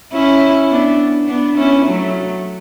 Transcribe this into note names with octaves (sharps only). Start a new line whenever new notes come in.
C#4 E4
B3 D4
B3 D4
C#4 E4
F#3 A3